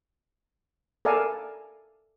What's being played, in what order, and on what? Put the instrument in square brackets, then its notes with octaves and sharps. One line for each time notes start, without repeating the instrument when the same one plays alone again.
[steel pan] A4 A#4 D5 F5 G#5